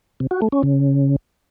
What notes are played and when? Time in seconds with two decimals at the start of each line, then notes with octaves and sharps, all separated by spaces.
0.20 C3
0.31 F#4
0.42 A3
0.52 C#4
0.63 C#3